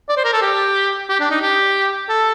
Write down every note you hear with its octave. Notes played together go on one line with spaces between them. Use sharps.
D5
C5
A#4
A4
G4
G4
D4
D#4
G4
A4